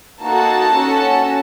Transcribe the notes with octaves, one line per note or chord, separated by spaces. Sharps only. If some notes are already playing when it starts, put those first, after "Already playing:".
A#3 D#4 F#4 A4 A5
C#4 F#4 A4